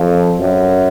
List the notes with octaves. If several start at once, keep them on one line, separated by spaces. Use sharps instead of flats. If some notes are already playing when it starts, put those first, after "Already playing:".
Already playing: F2
F#2